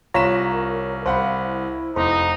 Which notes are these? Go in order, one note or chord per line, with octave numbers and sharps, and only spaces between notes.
C2 F4 C#5 A#5 B6 E7
A#4
C2 C5 F5 F#5 B5
E4
F1 D#4 E4 C5